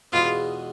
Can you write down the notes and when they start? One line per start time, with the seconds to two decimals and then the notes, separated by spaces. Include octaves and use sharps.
0.12 E2 B2 G#3 B3 F4